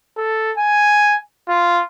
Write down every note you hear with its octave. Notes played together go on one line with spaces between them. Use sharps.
A4
G#5
F4